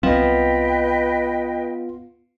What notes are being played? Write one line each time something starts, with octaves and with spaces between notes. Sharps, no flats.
C2 F#3 B3 C4 F4 B4 D#5 G5